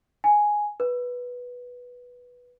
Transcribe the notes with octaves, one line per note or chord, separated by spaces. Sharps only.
G#5
B4